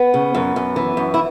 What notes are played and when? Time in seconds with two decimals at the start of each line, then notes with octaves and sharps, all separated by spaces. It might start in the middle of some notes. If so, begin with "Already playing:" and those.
Already playing: B3
0.14 C#3
0.35 F#2
0.56 F#2
0.76 E3
0.97 F#2
1.14 E4